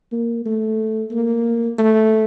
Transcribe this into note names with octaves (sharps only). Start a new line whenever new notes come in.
A#3
A3
A#3
A3